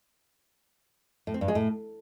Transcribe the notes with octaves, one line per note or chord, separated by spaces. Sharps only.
A2
C4
G2
G#3
A2